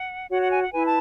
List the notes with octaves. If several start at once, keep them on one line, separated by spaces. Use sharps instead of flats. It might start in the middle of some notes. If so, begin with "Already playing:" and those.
Already playing: F#5
F#4 C#5 F#5
F#5
G#5
F#5
E4 B4 G#5
A5